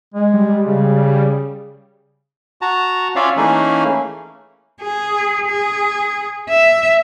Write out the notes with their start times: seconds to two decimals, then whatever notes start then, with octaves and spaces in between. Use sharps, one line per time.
0.14 G#3
0.34 G3
0.67 C#3
2.62 F#4 A5 A#5
3.16 C#4 F4 C#5 D5 E5 F5
3.37 E3 A3 A#3 C#4 D#4 G#4
4.82 G#4
5.47 G#4
6.50 E5